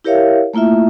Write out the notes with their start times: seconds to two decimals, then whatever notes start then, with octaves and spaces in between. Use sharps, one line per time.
0.04 E4 G4 A#4 C#5 E5 F5
0.53 A3 A#3 E4 F4 E5